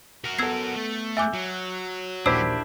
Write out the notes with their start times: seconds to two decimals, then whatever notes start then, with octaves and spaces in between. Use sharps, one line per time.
0.24 F#4 A#4
0.39 B3 A4 E6 G#6 C7
0.75 A3
1.17 E5 G#5 D6 E6 F#6 G6
1.34 F#3
2.26 A#1 D#2 D4 E4 G4 C5 E6